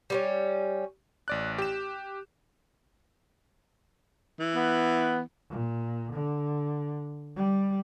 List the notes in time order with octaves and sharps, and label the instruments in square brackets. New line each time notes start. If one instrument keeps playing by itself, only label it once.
[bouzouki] G3 B3 C#4
[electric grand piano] A1 D5 F#6
G4 E7
[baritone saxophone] E3
[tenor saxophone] B3
[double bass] A#2
D3
G3